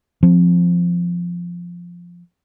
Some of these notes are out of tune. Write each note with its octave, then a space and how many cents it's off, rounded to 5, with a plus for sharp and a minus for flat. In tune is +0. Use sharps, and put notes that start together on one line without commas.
F3 +0 C4 +0